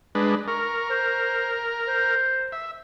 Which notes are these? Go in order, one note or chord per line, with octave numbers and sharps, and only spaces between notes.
G#3 D4 B4
A#4 C#6
C5
C5
E5